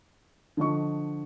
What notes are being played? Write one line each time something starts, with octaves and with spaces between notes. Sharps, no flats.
D3 F3 D#5 C#6